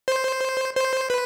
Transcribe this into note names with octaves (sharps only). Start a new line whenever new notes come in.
C5
C5
B4